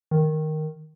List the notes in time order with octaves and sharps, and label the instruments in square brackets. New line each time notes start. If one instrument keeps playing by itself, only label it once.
[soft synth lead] D#3